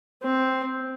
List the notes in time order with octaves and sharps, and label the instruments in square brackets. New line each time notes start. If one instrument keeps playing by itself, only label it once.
[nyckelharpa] C4